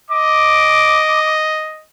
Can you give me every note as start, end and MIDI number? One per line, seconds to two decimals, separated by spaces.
0.11 1.84 75
0.11 1.34 86